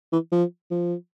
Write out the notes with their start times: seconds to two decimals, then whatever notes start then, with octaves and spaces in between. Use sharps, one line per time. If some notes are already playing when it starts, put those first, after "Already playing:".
0.12 E3
0.32 F3
0.71 F3